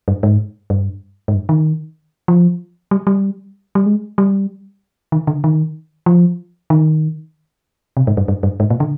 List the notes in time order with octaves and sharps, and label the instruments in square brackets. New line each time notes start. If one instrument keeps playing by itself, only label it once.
[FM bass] G2
G#2
G2
G#2
G2
D#3
F3
G3
G3
G3
G#3
G3
D#3
D3
D#3
F3
D#3
C3
G#2
G2
G2
G2
G#2
A#2
D3